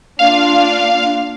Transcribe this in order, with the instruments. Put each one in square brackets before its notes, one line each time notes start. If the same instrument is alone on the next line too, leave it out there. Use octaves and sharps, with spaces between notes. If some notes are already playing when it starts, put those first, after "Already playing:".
[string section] A#3 D4 F4 [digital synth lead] F5